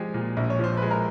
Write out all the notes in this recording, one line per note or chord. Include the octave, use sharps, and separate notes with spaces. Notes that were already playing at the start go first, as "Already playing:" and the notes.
Already playing: F3 G#3 G4
A#2
A#1
C#5
F3 C5
G#3 B4
A#4